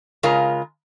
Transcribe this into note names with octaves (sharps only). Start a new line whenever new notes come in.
C#3 G#3 F4 A#4